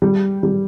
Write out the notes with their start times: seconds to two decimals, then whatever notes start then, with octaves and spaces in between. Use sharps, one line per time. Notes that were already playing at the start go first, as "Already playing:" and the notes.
0.02 G3
0.43 G3